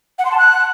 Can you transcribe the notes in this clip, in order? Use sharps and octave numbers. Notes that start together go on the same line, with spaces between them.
F#5
C6
A5
F#6